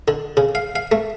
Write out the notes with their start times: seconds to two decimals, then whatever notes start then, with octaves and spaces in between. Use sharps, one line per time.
0.08 D3
0.37 C#3
0.55 F5
0.76 F5
0.92 A3